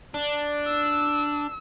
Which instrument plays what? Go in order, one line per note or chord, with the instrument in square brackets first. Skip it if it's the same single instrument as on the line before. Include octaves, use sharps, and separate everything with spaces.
[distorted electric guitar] D4
[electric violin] E6